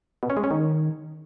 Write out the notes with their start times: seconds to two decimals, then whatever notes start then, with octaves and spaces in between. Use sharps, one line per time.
0.23 B2
0.30 C#4
0.37 G#3
0.44 C#4
0.51 D#3